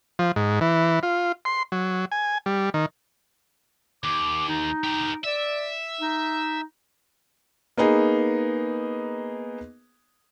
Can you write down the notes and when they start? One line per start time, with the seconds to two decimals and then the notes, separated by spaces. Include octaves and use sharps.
0.19 F3
0.36 G#2
0.61 E3
1.03 F4
1.45 C6
1.72 F#3
2.12 G#5
2.46 G3
2.74 D#3
4.04 D#2 D6
4.49 D#4
4.84 G4 A#4
5.24 D5 E5
6.01 D#4
7.77 A#3 B3 D#4 G#4